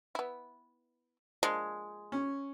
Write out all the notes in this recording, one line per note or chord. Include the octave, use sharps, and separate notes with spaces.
B3 E4
F3 G#3 A#3 D4
C#4